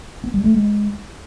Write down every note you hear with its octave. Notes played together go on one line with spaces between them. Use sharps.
B3
G3
A3
G#3